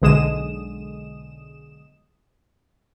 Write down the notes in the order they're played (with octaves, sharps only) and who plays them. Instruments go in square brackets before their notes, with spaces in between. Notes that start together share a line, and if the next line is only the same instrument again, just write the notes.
[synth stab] B1 D3 G#3 D#6 E7